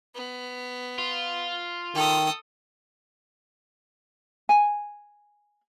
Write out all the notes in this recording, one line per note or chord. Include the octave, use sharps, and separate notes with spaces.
B3
F4
D#3 A4 D#6
G#5